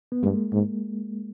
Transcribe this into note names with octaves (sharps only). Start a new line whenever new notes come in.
B3
G2 G#3 A#3
G#2